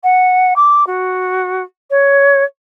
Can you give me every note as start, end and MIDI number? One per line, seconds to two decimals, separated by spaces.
0.03 0.53 78
0.56 0.86 86
0.86 1.63 66
1.90 2.43 73